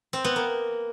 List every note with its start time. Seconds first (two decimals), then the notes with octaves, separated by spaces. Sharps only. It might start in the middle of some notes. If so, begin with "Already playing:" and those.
0.13 C4
0.25 B3
0.36 A#3